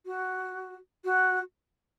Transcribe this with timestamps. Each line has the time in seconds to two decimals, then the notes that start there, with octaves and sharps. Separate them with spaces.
0.06 F#4
1.04 F#4